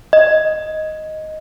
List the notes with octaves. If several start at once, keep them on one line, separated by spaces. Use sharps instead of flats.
D#5